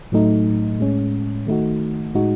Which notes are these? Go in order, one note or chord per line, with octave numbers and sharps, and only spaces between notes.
A2 F#3 A3 D#4
A2 G#3 C#4
D#3 A3 D#4 F#4
A2 G#3 D#4 F#4